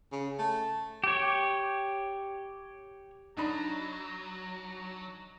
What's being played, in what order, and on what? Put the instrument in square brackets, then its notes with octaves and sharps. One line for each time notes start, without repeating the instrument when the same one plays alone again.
[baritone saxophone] C#3
A3
[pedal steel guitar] G4 C#5
[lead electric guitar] F#3 [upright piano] D4 D#4 B5 [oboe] A#5